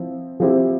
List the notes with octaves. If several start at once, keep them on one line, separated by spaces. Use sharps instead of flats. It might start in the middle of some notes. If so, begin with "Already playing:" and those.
Already playing: F3 C4 E4
F3 C4 E4 G4